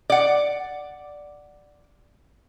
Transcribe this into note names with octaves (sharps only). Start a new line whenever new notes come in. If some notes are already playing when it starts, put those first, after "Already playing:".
D5 F#5